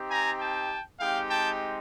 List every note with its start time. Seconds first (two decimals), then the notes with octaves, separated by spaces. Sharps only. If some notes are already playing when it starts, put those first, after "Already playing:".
Already playing: C4 D#4 G4
0.09 G#5 A#5
0.39 G5 A5
1.00 G#3 C4 D#4 G4 F5 G5
1.30 G5 A5